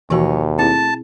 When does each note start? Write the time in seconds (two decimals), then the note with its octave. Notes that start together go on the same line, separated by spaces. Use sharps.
0.10 D#2 B2 E3 F3 F#4 C#5
0.59 A3 C4 E4 G#4 A5